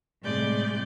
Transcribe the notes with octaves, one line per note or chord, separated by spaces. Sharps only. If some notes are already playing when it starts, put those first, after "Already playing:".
A2 C3 G3 G#3 D5 G6